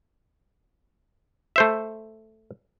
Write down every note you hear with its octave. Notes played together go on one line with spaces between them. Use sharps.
A3 C5 E5